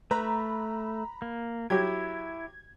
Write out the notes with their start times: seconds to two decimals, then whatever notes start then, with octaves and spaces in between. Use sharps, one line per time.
0.11 A3 B4 A#5 B5
1.22 A#3
1.70 F#3 E4 G4 G#6